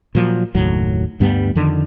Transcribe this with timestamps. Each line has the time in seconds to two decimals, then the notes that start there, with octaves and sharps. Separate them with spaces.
0.15 A#2 F3 F#3
0.55 F#1 D#2 A2 F#3
1.20 D2 G2 G3 B3
1.55 F2 D3 D#3